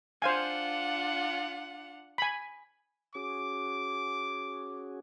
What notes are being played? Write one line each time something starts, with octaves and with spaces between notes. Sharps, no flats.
D4 F4 C5 F5 F#5 G#5
G#5 B5
C#4 F#4 G#4 D6